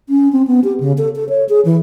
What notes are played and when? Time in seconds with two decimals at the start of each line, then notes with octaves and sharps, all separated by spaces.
0.09 C#4
0.33 C4
0.47 B3
0.64 G4
0.80 C#3
0.98 A4
1.16 A4
1.29 C#5
1.49 G#4
1.65 E3